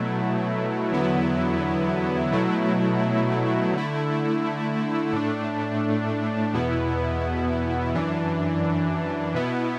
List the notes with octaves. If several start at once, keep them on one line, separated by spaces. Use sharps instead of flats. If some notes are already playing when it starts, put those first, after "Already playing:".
Already playing: B2 F#3 A3 E4
E2 D3 F#3 B3 E4
B2 F#3 A3 E4
D3 A3 E4
A2 A3 D4
E2 B2 B3 E4
F#2 E3 D4
B2 B3 E4